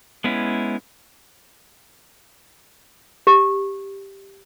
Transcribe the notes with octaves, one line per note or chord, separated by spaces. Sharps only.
G#3 B3 C#4 E4
G4